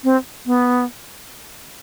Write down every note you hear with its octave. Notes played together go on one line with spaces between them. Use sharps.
C4
B3